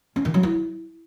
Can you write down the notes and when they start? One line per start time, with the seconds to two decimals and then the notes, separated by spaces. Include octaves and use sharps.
0.16 C#4
0.25 D#3
0.34 F#3
0.43 E4